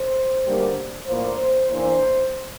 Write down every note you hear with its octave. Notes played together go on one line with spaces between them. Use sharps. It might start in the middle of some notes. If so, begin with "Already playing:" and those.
Already playing: C5
D2 D3 G3 A#3 D4
A2 F3 A#3 D4 C5
E2 E3 A#3 D4 C5